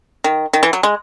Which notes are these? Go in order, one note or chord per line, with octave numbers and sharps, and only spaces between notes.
D#3
D#3
E3
F#3
G#3